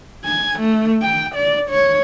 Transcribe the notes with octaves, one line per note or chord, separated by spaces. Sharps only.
G#5
A3
G5
D5
C#5